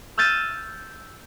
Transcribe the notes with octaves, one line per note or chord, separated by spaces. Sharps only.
E6 F6 G6 A6 D#7 E7